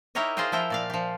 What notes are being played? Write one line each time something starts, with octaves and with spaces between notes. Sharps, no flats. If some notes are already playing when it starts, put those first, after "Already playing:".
D#4 E4 G4 A#4 C#5 D#5
F4 G#4 C5 D#5 G5
F3 E4 G5 A#5
A#2 D5 F5
F3 G4